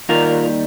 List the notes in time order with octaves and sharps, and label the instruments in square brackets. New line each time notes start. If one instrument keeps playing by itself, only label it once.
[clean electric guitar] D#2 D#3 G3 F4 A#4